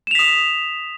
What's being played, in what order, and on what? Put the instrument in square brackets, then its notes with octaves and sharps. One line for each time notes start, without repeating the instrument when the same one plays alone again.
[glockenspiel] E7
F7
B6
D#6